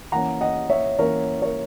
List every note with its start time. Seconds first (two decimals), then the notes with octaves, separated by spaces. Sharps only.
0.12 E3 A#3 C#4 F#5 A#5
0.41 D#5 F#5
0.70 C#5 E5
0.98 E3 A#3 C#4 A#4 C#5
1.42 A#4 C#5